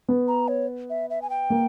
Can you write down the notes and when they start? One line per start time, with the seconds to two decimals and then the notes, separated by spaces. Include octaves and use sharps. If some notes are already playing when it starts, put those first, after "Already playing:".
0.08 B3
0.28 A#5
0.48 C#5
0.90 E5
1.10 E5
1.22 G#5
1.30 G5
1.50 A#3